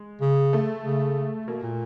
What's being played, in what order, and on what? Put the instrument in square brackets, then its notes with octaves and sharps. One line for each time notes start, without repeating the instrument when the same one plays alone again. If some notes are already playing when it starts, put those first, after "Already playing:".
Already playing: [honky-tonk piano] G#3
[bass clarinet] C#3
[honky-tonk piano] A3
[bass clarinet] C#3
[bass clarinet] B2 [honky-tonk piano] A#3
[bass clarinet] A#2